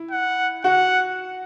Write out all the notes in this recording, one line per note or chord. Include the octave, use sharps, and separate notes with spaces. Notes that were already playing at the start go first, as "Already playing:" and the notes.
Already playing: E4
F#5
F#4 F#5